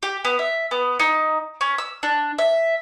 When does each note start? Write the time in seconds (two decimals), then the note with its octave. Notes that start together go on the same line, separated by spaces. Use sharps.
0.03 G4
0.25 B3
0.39 E5
0.71 B3
1.00 D#4
1.61 C#4
1.78 E6
2.03 D4
2.38 E5